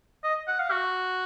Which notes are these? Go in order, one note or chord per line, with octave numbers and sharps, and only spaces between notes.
D#5
F#5
F5
F#4